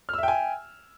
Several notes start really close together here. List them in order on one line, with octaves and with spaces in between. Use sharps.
F6 E6 E5 G5 G#5